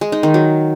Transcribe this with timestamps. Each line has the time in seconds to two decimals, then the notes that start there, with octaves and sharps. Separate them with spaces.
0.01 G#3
0.12 D#4
0.23 D#3
0.34 F#3